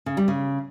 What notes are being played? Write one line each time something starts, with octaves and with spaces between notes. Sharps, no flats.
C#3
G3
C#3